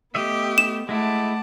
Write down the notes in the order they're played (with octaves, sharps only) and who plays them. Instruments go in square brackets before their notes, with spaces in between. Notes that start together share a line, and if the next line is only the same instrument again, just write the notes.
[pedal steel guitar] A3 D#5 E5 [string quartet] B3 [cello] G4
[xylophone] E7
[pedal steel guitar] G#3 E4 [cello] A3 [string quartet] F#5 A5 D6